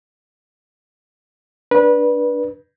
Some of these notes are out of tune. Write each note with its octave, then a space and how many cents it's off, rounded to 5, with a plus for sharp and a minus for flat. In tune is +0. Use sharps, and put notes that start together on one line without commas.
D4 +0 B4 -25